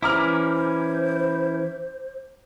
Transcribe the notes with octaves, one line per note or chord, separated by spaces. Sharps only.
E3 C#4 E4 C5 A#5 D6 F6